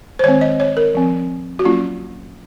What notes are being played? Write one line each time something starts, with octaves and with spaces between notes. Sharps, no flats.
C5
D#3 G#3 C4 C#5
D#5
C#5
A#4
F3 C4
F#4
F#3 A#3 C#4 F4